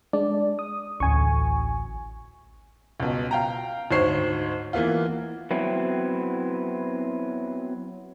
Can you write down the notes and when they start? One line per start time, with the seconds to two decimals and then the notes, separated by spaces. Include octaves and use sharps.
0.13 G#3 D4 D5
0.59 D#6
1.00 A1 D2 G#5 C#6
3.00 C#2 B2
3.31 F5 G5 A#5
3.91 D2 G#2 C5 C#5 C7
4.73 E3 A#3 B3 F4
5.51 F#3 B3 C4 E4